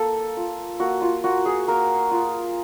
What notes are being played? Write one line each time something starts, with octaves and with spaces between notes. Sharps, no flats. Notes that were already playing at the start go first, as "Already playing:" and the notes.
Already playing: A#3 A4
F4
A#3 F#4
F4
A#3 F#4
G#4
A#3 A#4
F4